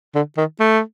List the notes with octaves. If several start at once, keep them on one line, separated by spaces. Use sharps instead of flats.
D3
D#3
A3